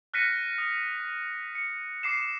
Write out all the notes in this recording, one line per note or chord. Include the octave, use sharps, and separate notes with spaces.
F6 F#6 A#6 B6 C#7 D#7
D#6
C#7
D6 C7 E7